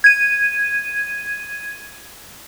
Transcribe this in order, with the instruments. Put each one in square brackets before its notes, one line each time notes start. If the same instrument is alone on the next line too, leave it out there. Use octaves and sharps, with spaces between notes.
[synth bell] G#6 D#7